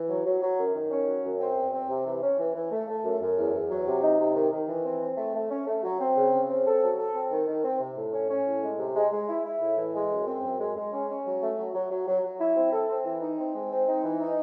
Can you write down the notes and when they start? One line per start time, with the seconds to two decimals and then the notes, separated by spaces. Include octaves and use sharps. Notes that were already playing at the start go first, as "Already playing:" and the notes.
Already playing: E3
0.09 F#3
0.25 F#3
0.41 F#3
0.58 F#2
0.75 D#3
0.91 C#4
1.07 F#3
1.24 F#2
1.41 C4
1.56 E2
1.72 C4
1.89 C3
2.06 E3
2.22 C#4
2.39 E3
2.55 E3
2.71 A3
2.88 A3
3.04 F#2
3.20 F#2
3.37 E2
3.54 E2
3.70 F#3
3.86 C3
4.03 D#4
4.19 C3
4.35 D#3
4.52 D#3
4.68 E3
4.85 C4
5.01 C4
5.17 A3
5.34 A3
5.50 C#4
5.67 A3
5.83 F#3
6.00 C4
6.16 C#3
6.32 C#3
6.49 C4
6.65 A4
6.82 F#3
6.98 A4
7.14 C4
7.31 D#3
7.47 D#3
7.64 C4
7.80 C3
7.96 A2
8.12 C#4
8.29 C#4
8.46 A2
8.62 G#3
8.78 C3
8.95 G#3
9.11 G#3
9.28 E4
9.44 E4
9.60 A2
9.77 E3
9.93 G#3
10.10 F#2
10.26 C4
10.43 F#2
10.59 G#3
10.76 G#3
10.92 C#4
11.08 C#4
11.25 F#3
11.41 A3
11.57 F#3
11.74 F#3
11.90 F#3
12.07 F#3
12.23 F#3
12.40 E4
12.56 C4
12.72 A4
12.89 C4
13.05 E3
13.22 D#4
13.38 C4
13.55 G#3
13.71 C4
13.87 D#4
14.04 E3
14.20 D#4